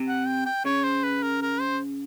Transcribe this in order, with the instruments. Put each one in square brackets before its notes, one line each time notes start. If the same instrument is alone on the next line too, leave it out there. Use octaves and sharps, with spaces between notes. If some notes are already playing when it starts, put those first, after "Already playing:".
Already playing: [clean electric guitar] C3
[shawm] F#5
G5
G5
[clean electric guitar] C#3 [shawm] C#5
[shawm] C5
B4
A#4
A#4
C5